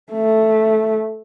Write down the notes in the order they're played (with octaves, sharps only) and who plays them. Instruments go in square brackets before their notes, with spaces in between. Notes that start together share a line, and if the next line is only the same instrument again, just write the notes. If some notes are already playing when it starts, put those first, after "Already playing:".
[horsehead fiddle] A3